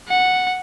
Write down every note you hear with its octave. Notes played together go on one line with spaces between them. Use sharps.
F#5